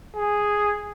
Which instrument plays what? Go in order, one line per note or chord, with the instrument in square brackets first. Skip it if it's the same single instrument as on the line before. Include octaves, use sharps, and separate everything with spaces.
[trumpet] G#4